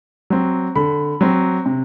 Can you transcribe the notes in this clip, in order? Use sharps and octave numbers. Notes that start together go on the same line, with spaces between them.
F#3 C4
D3 B5
F#3 C4
C3